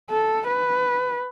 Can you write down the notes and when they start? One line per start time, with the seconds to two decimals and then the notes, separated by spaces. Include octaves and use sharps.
0.10 A4
0.48 B4